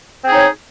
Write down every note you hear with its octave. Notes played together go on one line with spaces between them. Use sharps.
C4 D#4 G#4 C#5